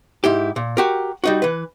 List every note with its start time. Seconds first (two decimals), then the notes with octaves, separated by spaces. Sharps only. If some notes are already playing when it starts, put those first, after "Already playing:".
0.24 G#2 E4 G4
0.56 A#2
0.77 F#4 G4 A#4
1.24 G3 D#4 F#4
1.42 E3 B4